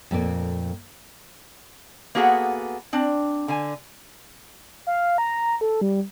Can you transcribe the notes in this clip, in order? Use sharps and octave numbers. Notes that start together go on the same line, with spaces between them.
F2 A#2 A3 A#3 D5
A#3 B3 F#4 G#4 A4 F#5
C4 D4
D3 G#5
F5
A#5
A4
G3